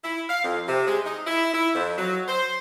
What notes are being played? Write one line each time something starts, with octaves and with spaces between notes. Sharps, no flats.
E4
F5
F2
C3
G#3
D#4
E4
E4
F2
F#3
C5